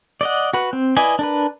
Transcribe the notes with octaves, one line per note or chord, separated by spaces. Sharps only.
D5 D#5 F#5
F#4 B4
C4
E4 B4 D5 D#5 G#5
D4 A#4 B4